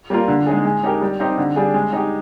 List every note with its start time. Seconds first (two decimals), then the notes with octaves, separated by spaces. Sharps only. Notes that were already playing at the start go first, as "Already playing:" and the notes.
0.10 G3 A#3 F4 A#4
0.28 D3
0.46 G#3 D#4 G#4
0.65 G#3
0.84 D#4 G4 A#4
1.01 G3
1.20 C4 D#4 G4
1.38 D3
1.56 G3 D4 G#4
1.74 G#3
1.93 D#4 G4